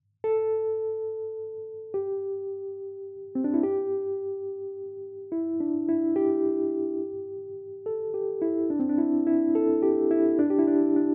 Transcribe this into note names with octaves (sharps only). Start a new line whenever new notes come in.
A4
G4
C4
D4
E4
G4
E4
D4
E4
G4
A4
G4
E4
D4
C4
D4
E4
E4
A4
G4
E4
D4
G4
E4
D4
D4